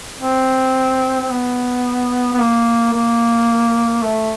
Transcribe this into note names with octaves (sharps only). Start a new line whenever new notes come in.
C4
C4
B3
B3
A#3
A#3
A3